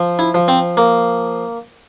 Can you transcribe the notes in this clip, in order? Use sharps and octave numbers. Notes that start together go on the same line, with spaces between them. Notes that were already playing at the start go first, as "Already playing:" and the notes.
Already playing: F3
E4
F3
C4
A#3